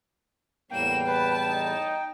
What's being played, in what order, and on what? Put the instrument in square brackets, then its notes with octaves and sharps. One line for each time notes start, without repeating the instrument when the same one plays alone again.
[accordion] E2 A2 G3 [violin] A#3 E7 [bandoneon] G5
[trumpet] B4 [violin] A5
[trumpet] D#4